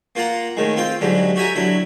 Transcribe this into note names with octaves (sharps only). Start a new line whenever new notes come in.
A#3 F4 F#5 A#5
A2 D#3 G#3
C4 F4 F5 G5
G#2 D3 F#3 G3
F#4 G4 E5 G#5 A#5
D3 F#3 E4